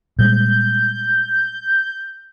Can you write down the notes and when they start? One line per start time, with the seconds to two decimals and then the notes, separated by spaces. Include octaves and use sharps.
0.19 A#2 G3 G#3 G6